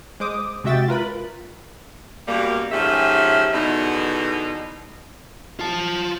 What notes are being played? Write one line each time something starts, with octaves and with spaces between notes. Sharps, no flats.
G#3 C5 D6 D#6
C3 G#3 F#4 E5 G5 A6
F4 A#4 B4 B5
F#2 B2 G3 A#3
G#2 F3 A3 C#4 G4 E5
E2 B2 D3 D#4
F4 A5